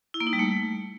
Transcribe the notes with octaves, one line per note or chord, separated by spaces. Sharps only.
E4
A#3
D#4
G3
A3